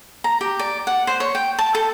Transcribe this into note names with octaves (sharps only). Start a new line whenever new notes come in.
A#5
G4
D5
F#5
C5
C#5
G5
A5
A4